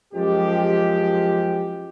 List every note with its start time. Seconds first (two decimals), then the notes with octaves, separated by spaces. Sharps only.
0.13 F#2 F3 G#3 G4